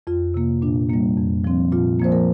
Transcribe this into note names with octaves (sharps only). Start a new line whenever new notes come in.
F2 F4
C3 A#3
A#2 D4
G3 A#3
F2
F3 C4
A#2 F4
F3 A#3 C5
A#4